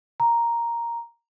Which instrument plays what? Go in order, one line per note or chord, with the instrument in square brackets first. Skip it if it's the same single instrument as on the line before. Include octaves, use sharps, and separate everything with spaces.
[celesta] A#5